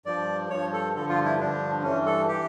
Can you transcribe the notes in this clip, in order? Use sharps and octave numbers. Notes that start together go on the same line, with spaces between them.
G2 F3 D5
G2 F3 C#5
A4
G2 D3 F3 A4
F4
E4
G2 D3 F3 D4
G2 E3 C#4
A4
E3 G4